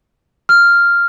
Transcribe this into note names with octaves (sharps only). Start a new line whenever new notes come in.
F6